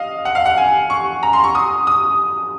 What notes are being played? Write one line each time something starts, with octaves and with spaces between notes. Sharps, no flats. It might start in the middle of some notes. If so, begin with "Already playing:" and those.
Already playing: D#5 F5
F#5
F5
F#5
G#5
C#6
A#5
C6
C#6
D#6
D#6